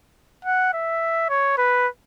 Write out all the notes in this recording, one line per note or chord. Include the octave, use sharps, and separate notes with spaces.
F#5
E5
C#5
B4